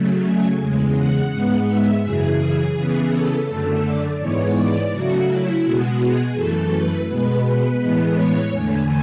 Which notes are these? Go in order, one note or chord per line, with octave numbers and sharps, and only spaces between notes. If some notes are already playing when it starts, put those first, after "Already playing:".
Already playing: C#3 F#3 A3
G#5
E2 C#3 G#3
F#5
G#2 G#3 B3
E5
F#2 C#3 E3 G#4
C#3 E3 B3
A4
F#2 D3 A3
D5
G#2 E3 G#3 B3 C#5
D5
C#3 F#3 A3 F#4
E4
B2 G#3 B3 F#4
G#4
F#2 E3 A3 A4
B4
B2 G#3 B3 B4
A2 E3 G#3 B3
C#5
E2 D3 A3 G#5